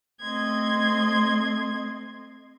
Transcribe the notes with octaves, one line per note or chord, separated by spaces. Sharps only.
A3 C4 D#5 C6 G#6